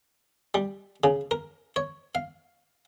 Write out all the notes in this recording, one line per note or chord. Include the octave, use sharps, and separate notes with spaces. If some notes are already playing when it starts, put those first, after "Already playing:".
G3
C#3
A#4
C#5
F5